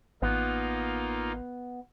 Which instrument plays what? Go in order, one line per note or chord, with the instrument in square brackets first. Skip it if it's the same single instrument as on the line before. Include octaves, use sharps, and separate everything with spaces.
[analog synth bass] A1 [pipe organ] A#3 D#4 F4 [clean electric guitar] B3